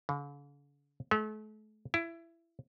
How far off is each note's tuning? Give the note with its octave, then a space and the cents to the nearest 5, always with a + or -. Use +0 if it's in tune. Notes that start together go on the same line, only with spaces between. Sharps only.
D3 -45
A3 -40
E4 +20